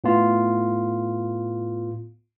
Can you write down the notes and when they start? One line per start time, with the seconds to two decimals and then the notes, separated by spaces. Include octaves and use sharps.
0.04 A2 B3 F4